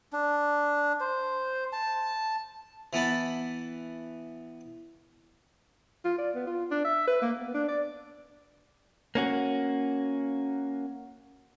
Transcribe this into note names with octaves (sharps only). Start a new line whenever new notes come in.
D4
C5
A5
E3 B3 A5 B5
F4
D5
B3
F4
D4
E5
B4
A#3
B3
D4
D5
A#3 C#4 F#4